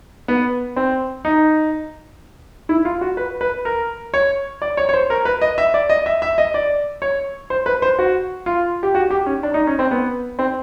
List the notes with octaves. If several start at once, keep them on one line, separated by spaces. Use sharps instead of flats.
B3
C4
D#4
E4
F4
F#4
B4
B4
A#4
C#5
D5
C#5
C#5
C5
A#4
B4
D#5
E5
D5
D#5
E5
E5
D#5
D5
C#5
C5
B4
C5
F#4
F4
G4
F#4
G4
C#4
D4
D#4
C#4
C4
B3
C4